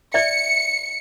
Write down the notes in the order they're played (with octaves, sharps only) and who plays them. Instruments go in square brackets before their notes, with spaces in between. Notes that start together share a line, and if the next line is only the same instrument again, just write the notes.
[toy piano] D5 E5 [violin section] C#7